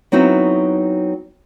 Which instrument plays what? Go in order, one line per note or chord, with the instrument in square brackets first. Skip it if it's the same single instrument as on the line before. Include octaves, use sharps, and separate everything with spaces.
[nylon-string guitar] F#3 B3 C4 D#4 E4 F#4